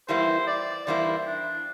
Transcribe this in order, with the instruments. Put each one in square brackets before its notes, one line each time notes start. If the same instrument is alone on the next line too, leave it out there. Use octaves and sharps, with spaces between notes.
[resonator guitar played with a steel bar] E2 E3 G3 A#3 E4 [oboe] C5
[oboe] D5
[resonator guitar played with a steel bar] E2 E3 G3 A#3 E4 [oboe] C5
[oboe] D4